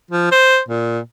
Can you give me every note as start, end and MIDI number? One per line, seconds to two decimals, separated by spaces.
0.11 0.31 53
0.32 0.59 72
0.68 0.99 46